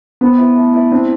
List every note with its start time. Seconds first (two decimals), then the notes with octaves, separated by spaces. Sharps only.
0.21 B3 C4
0.38 E4 B4
0.56 A3
0.74 E4 B4 D5
0.91 C4 D4